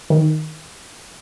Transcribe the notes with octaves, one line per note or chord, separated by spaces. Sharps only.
D#3